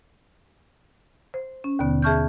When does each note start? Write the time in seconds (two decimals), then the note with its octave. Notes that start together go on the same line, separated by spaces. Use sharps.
1.34 C5
1.64 C#4
1.79 D#2 B2 D3 B3
2.02 G#4 E5 A5 C#6 F6 G6